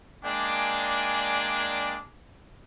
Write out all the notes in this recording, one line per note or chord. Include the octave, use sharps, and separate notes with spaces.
G#3 A#3 D4 D5 G5 G#5